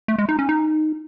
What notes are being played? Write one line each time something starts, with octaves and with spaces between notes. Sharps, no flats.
A3
G#3
D#4
C#4
D#4